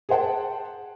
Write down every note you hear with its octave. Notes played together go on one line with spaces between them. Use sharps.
G#4 A#4 C5 F#5 G5 A5